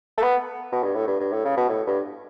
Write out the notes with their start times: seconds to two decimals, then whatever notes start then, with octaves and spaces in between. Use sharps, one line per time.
0.18 A3
0.22 B3
0.72 B2
0.84 G2
0.95 A2
1.08 G2
1.20 G2
1.32 A2
1.45 C#3
1.57 B2
1.69 A2
1.87 G2